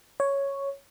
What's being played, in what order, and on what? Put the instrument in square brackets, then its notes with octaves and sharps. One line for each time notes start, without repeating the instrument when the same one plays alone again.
[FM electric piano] C#5